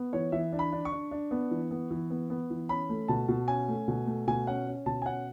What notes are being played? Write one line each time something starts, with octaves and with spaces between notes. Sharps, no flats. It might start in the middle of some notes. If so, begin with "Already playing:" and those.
Already playing: B3
E3 C#5
E3 E5
D4
B5
D4
C#6
D4
D4
B3
E3
B3
E3
B3
B3
E3
C#4 B5
A3
B2 A5
B2
C#4 G#5
A3
B2
A3
B2 G#5
C#4 F#5
C#4
B2 A5
G#5
C#4 F#5